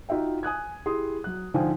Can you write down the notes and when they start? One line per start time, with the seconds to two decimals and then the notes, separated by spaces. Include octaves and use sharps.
0.09 D#4 F4 F#4 E5 G5
0.43 G#5 D#6 F#6 G#6
0.86 E4 G4 G#4 C6 D#6
1.24 F#3 F#6
1.54 G#2 D3 F3 F5 G5 G#5